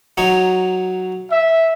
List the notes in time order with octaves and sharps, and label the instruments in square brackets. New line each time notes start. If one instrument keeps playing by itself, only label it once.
[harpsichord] F#3 D#4 C#5
[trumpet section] E5